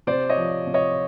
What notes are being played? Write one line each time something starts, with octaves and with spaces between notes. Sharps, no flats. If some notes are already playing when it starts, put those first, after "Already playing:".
C3 C5 D5
C#5 D#5
F3
C3
C#5 D#5